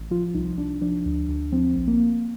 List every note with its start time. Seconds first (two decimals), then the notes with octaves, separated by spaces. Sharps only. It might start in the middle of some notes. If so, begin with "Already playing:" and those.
Already playing: A1
0.11 F3 F4
0.34 C2 D#4
0.57 C2 D4
0.81 F3 D4
1.06 D2
1.29 D2
1.52 F3 C4
1.76 A#1
1.88 A#3